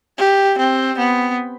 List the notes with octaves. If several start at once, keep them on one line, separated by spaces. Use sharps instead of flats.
G4
C4
B3